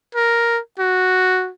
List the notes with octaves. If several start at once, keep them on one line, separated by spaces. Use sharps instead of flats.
A#4
F#4